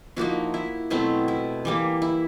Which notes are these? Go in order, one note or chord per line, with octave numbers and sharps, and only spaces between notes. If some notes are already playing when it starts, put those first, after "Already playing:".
F3 A#3 D#4 E4 F#4
E4
B2 F#3 A3 C4 E4
E4
E3 G3 A#3
E4